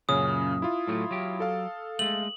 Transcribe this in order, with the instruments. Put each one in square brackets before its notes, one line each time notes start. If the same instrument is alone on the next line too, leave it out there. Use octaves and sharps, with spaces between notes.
[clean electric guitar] F#2 A#2 [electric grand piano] C#3 C#4 [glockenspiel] D#6
[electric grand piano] E4 F4
[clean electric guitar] A2 F#3 A3
F#3 G4
[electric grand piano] A4 F5
[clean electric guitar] G#3 A3 [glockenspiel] F#7